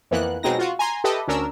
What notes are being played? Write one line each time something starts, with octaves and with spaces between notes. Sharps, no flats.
F2 E3 A#3 B3 F#6
B2 F#3 G#3 C4 D#4 A#6
F4 F#4
G#5 A#5 C6
G4 A4 B4 D#5 E5
D2 C#4 D4 A#4 E6